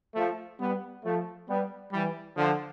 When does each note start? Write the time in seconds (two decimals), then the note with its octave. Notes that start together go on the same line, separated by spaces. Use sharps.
0.15 F3 A3
0.59 G3 B3
1.04 F3 A3
1.49 G3 B3
1.92 E3 G3
2.36 D3 F3